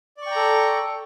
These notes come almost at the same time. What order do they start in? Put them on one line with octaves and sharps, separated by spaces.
D5 C#6 G5 A#5 A4